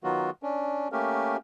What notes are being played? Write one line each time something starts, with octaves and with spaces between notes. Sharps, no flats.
D#3 F#3 B3 F4 F#4
C#4 D4
A3 A#3 C#4 G4 A#4